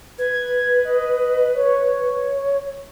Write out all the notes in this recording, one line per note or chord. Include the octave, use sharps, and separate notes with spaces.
B4 G#6
D#5
C#5